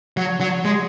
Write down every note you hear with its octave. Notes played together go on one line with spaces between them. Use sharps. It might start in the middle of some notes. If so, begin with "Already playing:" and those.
F#3
F#3
G#3